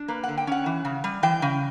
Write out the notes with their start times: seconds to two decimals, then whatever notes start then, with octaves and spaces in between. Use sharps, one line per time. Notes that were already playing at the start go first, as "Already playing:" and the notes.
Already playing: D4
0.08 A#3 B4
0.23 D3 F#5
0.38 G5
0.47 C#4 F#5
0.66 E3
0.85 C#3
1.04 G3
1.23 E3 G5
1.42 C#3